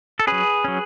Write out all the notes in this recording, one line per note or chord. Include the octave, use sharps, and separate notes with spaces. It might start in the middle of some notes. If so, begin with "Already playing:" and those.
A4
F#3 C#4 G#4 B4
F#3 C#4